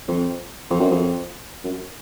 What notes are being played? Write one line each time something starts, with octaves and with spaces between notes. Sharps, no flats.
F2
F2
F#2
F2
F#2